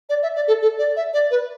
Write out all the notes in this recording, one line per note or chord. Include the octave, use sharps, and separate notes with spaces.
D5
E5
D5
A4
A4
D5
E5
D5
B4